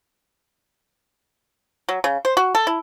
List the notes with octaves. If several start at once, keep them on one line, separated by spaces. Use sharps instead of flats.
F#3
C#3
C5
F#4
A4
E4